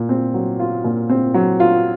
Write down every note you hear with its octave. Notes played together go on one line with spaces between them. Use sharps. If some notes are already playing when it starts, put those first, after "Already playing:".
Already playing: A#2
C4
F#3
F4
A#2
C4
F#3
F4